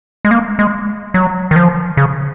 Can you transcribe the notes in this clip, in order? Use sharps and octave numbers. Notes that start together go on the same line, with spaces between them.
G#3
A#3
G#3
F#3
D#3
F3
C#3